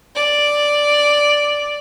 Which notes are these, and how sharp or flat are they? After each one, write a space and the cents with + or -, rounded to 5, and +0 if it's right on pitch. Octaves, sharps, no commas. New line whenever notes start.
D5 +0